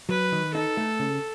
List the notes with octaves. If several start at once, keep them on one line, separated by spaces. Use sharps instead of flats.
F#3 B4
D#3
D#4 A4
A3
C#3